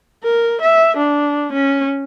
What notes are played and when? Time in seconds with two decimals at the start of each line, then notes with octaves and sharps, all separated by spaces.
0.23 A#4
0.62 E5
0.97 D4
1.53 C#4